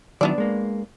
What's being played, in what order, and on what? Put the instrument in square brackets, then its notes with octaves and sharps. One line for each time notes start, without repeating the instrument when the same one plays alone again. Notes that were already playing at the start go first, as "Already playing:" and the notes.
[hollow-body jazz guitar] D#3 F#3 E4 [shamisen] B3 D4 D5
[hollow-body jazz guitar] G#3 A#3